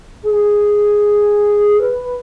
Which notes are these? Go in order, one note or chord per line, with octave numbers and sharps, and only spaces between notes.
G#4
B4